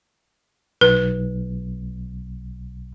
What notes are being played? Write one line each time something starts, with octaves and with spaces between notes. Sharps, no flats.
B1 B4